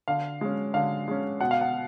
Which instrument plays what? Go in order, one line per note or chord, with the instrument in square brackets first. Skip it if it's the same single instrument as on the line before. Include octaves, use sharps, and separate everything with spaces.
[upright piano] D3 F5
G#3 C#4
D3 F5
G#3 C#4
B2 F#5
F5
F#5